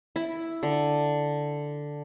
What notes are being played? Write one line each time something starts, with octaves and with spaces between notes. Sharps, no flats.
E4
D3